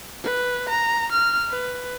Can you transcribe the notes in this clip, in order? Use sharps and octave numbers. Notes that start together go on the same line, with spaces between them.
B4
A#5
F6
B4